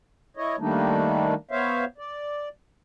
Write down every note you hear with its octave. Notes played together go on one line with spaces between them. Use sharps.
E4 C#5 D#5
D#3 G3 A3 A#3 D4 D#4
B3 C5 C#5 E5 F5
D5